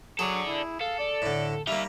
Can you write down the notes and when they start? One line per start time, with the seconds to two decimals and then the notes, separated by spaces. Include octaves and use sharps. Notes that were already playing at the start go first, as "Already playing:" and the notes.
0.19 F#3 G#4 A4 D5
0.47 E4
0.81 A4 F5
0.99 D5
1.22 A2 D3
1.68 G3 A#3 D#4 E5 F5